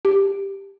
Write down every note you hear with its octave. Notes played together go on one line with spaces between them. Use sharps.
G4